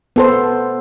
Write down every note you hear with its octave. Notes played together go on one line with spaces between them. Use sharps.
B3 A4 C5